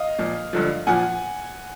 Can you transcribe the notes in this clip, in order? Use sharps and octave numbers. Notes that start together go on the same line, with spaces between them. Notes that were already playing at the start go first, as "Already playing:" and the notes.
Already playing: D#5 F5
A#2 F3
G2 D3 F3
A#2 F3 F#5 G#5